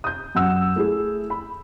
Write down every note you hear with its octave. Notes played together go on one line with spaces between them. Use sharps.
D#6 G6
F#2 F#5 E6
A3 E4 G#4
B5